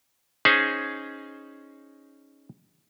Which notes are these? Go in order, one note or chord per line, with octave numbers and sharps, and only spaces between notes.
C#4 D#4 G#4 C5